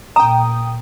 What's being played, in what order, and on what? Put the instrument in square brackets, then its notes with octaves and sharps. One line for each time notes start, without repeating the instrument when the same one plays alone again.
[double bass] A#2 [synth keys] G5 D#6 [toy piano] A#5